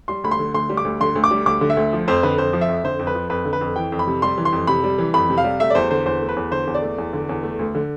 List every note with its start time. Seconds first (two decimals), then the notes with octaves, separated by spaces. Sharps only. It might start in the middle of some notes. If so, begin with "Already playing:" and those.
0.08 G3 C6
0.24 D2 B5
0.31 C6
0.39 D3
0.54 D2 C6
0.69 G3
0.77 D6
0.85 D2
1.01 D3 C6
1.16 D2
1.24 D6
1.31 G3
1.46 D2 D6
1.61 D3
1.70 E5
1.77 D2
1.93 F3
2.08 F2 C5
2.23 D3 B4
2.38 F2 C5
2.53 F3
2.61 E5
2.69 F2
2.84 D3 C5
2.99 F2
3.07 B4
3.15 F3
3.30 F2 B4
3.45 D3
3.53 B4
3.61 F2
3.76 E3 G5
3.92 F2
3.99 B5
4.07 C3
4.22 G3 C6
4.38 E3
4.45 C6
4.53 F2
4.67 C3 B5
4.84 G3
4.98 E3
5.14 F2 B5
5.30 C3
5.38 F5
5.44 G3
5.60 A3 E5
5.70 D5
5.75 E2 C5
5.91 D3 C5
6.06 E2 C5
6.21 A3
6.29 B4
6.37 E2
6.51 D3 C5
6.67 E2
6.74 D5
6.82 A3
6.98 E2
7.13 D3
7.29 E2
7.43 A3
7.59 D2
7.75 D3